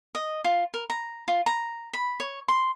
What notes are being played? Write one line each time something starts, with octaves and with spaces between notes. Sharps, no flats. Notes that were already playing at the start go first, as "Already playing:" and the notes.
D#5
F4
A#4
A#5
F4
A#5
B5
C#5
C6